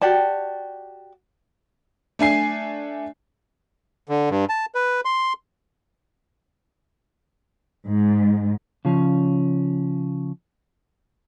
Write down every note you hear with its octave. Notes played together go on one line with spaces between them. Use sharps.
F#4 G4 D5 A5
A3 D4 G#5 C7
D3
G2
A5
B4
C6
G#2
C#3 F3 C#4